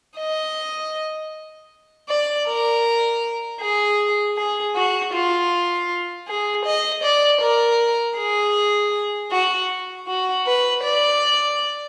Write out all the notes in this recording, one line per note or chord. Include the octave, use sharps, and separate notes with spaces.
D#5
D5
A#4
G#4
G#4
F#4
F4
G#4
D#5
D5
A#4
G#4
F#4
F#4
B4
D5